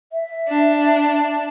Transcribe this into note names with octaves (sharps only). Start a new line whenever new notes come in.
E5
D4